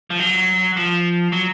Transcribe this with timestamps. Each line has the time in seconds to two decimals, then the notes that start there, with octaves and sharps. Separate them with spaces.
0.10 F3
0.20 F#3
0.76 F3
1.32 F#3